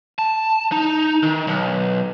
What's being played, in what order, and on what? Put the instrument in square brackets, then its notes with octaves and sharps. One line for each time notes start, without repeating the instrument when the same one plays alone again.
[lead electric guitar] A5
D#4
D#3
B1